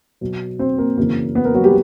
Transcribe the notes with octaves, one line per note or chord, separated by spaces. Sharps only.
B2 F#3
C4 C5
A#3 A#4
F#2 C#3 E3 A#3 A#4
B3 B4
A#3 A#4
F#3 F#4
G3 G4